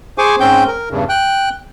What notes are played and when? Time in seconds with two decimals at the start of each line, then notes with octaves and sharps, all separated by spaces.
0.18 G#4 C5 G#5 C#6 D6
0.40 G#2 C4 C#4 G5 G6
0.67 A#4
0.90 E2 G2 C#3
1.09 G5 F#6